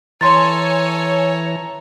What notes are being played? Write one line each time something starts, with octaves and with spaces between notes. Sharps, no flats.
E3 A4 C#5 G#5 A#5 C6 A6